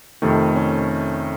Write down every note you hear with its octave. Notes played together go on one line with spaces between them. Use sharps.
F2 C3 D#3 A3
C#4